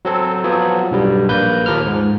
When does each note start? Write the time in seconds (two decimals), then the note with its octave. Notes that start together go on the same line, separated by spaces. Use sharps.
0.05 F#3 C4 A4
0.44 F3 F#3 B3
0.91 B1 G2 G3
1.28 A#1 A#3 B4 G6
1.66 D#2 F3 A#3 A#4 F6
1.87 G#2